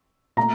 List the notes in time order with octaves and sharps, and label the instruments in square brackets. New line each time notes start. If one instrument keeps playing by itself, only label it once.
[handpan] A#2 A3 [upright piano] A#5